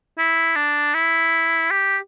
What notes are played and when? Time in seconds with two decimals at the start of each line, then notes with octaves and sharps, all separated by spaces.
0.18 E4
0.56 D4
0.94 E4
1.71 G4